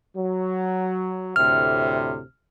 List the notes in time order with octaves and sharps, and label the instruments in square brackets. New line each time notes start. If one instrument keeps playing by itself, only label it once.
[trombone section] F#3
[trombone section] D2 A2 C3 [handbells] F6